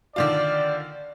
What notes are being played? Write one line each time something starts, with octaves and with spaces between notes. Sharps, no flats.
D3 D#3 F4 D5